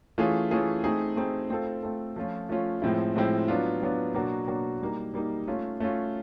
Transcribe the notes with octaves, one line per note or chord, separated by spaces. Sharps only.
E3 A3 C#4 F4 G#4
E3 A3 C#4 F4 G#4
A3 C4 D#4 G#4
A3 C4 D#4 G#4
A3 C4 F4 A4
A3 C4 F4 A4
F3 A3 C#4 F4
F3 A3 C#4 F4
A2 F3 G#3 C4 E4
A2 F3 G#3 C4 E4
F#3 B3 D4 F4
F#3 B3 D4 F4
B2 F#3 A#3 D4 F#4
B2 F#3 A#3 D4 F#4
G3 A#3 D#4
G3 A#3 D#4
A3 C#4 F4
A3 C#4 F4